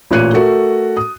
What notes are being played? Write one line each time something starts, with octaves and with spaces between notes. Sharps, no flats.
A1 A#2 C#5 F#6 C#7 D#7
A3 F#4 A4 A#4
D#6